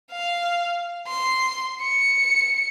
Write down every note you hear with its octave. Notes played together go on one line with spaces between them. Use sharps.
F5
C6
C#7